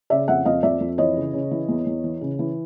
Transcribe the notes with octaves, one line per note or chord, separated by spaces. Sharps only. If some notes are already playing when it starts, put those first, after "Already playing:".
C#3 D5 E5
F2 E5 F#5
F2 D#5 F5
F2 D5 E5
F2
E3 C#5 D#5
C#3
C#3
E3
E2
E2
E3
C#3
E3